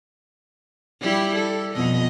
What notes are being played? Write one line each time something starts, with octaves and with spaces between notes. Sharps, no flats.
G3 E4 G4
A4
F2 B2 D#5